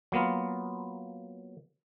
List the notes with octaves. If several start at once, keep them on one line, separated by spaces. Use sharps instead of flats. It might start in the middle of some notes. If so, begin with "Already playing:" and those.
F#3 A#3 B3 F4